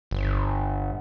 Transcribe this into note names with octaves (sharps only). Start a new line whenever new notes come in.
G1